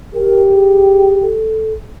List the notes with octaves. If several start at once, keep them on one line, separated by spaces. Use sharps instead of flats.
G4 A#4
G#4
A4